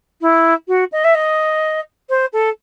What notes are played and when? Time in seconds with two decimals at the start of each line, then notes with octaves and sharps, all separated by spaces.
0.21 E4
0.68 F#4
0.92 D#5
1.04 E5
1.15 D#5
2.09 C5
2.33 A4